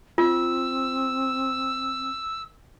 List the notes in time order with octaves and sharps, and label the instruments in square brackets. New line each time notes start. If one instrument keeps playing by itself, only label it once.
[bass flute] C4 [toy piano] F4 [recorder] E6